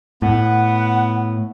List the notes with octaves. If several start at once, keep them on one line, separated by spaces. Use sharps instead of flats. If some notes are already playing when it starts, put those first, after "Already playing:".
A2 B3 F#5